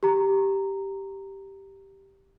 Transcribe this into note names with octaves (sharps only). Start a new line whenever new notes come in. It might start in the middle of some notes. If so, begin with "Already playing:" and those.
G4 A#5